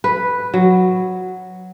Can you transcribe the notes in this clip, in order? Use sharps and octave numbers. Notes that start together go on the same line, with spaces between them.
B4
F#3